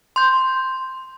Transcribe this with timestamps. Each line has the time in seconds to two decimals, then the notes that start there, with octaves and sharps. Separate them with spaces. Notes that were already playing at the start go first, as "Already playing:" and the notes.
0.16 C6 G6